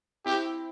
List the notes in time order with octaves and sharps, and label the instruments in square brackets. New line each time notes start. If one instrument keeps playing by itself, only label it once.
[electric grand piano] C4 E4 [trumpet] G4